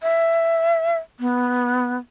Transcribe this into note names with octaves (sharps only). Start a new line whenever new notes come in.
E5
B3